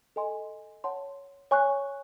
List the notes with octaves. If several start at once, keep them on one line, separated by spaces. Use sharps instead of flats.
A4 D#5 G#5 C6
C#5 F#5 A5 C6
C#5 G#5 C#6 F#6